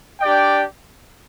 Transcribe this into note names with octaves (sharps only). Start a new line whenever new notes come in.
D4 G4 D5 G5